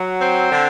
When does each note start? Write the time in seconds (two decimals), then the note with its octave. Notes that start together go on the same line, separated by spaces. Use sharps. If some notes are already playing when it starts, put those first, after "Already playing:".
Already playing: F#3
0.20 C4
0.51 D3